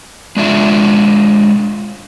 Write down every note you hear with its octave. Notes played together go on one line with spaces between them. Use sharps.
G#3 D4 F4 E5